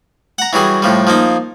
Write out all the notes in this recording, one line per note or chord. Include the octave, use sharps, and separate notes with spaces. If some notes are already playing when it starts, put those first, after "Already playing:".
F#5 A#5
E3 F#3 G3 G#4
A2 F3 G3
F3 A#3 D#4